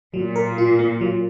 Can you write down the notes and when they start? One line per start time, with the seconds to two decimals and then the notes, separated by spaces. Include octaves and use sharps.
0.14 A#2 F#3
0.36 A#4
0.58 F4
0.79 A#3
1.01 F#3